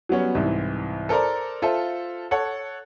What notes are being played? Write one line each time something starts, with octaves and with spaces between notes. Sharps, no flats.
F#3 G3 B3 C#4
C2 G#2 E3
A4 A#4 C5 D5 A#5
F4 A4 C5 E5
A4 C#5 F#5